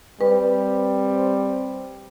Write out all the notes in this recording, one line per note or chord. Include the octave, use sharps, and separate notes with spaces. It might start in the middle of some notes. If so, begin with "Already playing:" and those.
G3 C4 B4